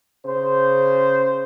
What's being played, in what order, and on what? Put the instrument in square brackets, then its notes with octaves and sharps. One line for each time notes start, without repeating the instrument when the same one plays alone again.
[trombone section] C#3 C5